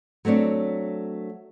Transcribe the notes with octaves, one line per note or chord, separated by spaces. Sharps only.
F#3 A3 C4 D4 C#5